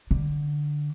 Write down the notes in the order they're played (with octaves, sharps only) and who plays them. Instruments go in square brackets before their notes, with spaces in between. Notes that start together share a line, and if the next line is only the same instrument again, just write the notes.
[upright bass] D3